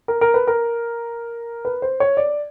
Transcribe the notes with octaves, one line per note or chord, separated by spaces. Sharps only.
A#4
A#4
B4
A#4
B4
C5
C#5
D5